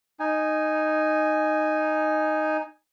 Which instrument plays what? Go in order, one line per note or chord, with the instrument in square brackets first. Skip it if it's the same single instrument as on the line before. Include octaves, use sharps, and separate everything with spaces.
[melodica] D#4 G#5